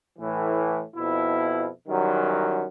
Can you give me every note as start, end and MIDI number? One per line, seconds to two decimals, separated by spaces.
0.18 0.81 45
0.18 0.81 52
0.96 1.66 41
0.96 1.66 47
0.96 1.66 64
1.88 2.64 42
1.88 2.64 51
1.88 2.64 52
1.88 2.64 54
1.88 2.64 55